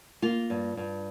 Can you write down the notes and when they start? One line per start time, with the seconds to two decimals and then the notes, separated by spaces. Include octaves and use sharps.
0.22 A#3 F4
0.50 G2
0.77 G2